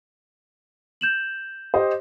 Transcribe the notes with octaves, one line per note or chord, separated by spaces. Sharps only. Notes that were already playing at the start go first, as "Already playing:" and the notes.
G6 E7 F#7
G4 C5 D#5